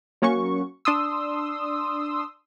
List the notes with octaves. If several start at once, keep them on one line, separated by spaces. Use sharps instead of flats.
F#3 A#3 C#4 F#4 C#6
D4 C6 D#6 E6